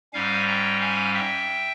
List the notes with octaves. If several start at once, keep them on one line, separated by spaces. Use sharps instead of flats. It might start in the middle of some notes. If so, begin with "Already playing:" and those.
G#2 G3 C#4 F5 G#5
G5 A#5
F5 G#5
E5 G5